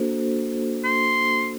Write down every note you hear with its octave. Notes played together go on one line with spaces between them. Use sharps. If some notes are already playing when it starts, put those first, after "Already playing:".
Already playing: A#3 D4 F#4 A4 C5
C6